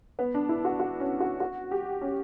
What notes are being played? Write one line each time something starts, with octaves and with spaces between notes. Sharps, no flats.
B3
D4
E4
F#4
F#4
C#4
F#4
F#4
G4
C#4